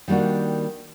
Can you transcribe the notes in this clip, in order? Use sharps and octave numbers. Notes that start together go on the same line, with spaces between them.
D#3 G3 A#3 D4 F#4